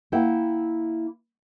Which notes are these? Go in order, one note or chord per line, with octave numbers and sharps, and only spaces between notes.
A#3 E4 E5 F#5 G5